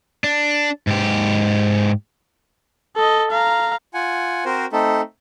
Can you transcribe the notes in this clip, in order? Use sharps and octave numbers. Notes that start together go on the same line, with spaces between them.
D4
G#2 G4
A4 D#5
F5 A#5
F4 F#5 G#5
C4 F#4 A#4 C5
A3 C4 D#4 A4